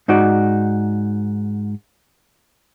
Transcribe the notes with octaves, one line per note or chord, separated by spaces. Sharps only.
G#2 D#4 F#4 D5